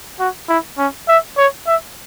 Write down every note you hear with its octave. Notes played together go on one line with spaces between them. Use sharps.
F#4
E4
C#4
E5
C#5
E5